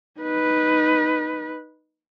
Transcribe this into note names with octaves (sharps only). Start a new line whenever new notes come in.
D#4 B4